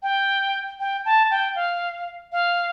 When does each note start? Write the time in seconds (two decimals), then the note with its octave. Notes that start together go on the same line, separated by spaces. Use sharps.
0.03 G5
0.79 G5
1.05 A5
1.31 G5
1.55 F5
2.32 F5